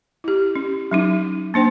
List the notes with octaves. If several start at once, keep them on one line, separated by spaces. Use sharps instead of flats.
E4 G4
C#4
F#3 C#4 D#4
A#3 D4 C5 G5